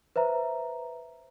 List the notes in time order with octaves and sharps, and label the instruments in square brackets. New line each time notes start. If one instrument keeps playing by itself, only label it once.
[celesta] B4 C5 E5 A#5